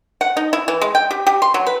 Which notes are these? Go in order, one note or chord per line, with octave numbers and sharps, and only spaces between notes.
F#5
D#4
E4
E3
G#3
G5
G4
G4
C6
F#3
B4